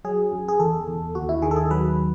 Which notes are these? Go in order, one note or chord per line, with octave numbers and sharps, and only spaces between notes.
F#3 G#4
F#2
G#4
E2 A4
E2
D#2 F#4
E4
D#3 G#4
A4
G#4
F#3 B4